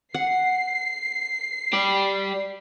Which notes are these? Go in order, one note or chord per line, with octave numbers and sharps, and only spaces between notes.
F#5 C7
G4 D5